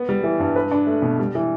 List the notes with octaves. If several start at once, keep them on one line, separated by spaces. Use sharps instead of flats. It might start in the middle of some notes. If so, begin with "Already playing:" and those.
Already playing: B3
G3
E3
G2
B4
D4
A3
B2
G3
E3